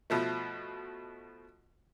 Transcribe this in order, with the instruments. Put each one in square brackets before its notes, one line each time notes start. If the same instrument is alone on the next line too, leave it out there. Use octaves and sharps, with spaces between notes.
[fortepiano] B2 F3 A3